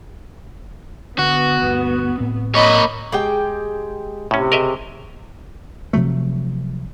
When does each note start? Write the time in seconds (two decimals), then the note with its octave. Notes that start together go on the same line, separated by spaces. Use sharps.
1.19 D3 B3 F#4
1.62 D2 G2
2.18 A2 C4
2.55 A#3 C#5 D#5 B5
3.12 G#3 G4 G5
4.31 A2 C3 C#4
4.52 C#3 A#4 D#5 E5
5.93 C3 F3 F#3 A3